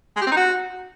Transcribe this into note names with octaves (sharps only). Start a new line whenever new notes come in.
G#3
G4
C4
D#4
F#4